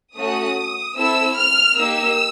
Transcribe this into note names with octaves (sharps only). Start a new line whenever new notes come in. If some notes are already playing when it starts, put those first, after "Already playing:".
A3 C#4 F#4 D#6
C4 E4 A4 E6
F6
A#3 D#4 G4 E6